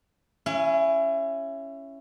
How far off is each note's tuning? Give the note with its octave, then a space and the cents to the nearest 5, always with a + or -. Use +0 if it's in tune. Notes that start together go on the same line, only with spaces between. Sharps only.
C#4 -5 E4 +20 F5 -45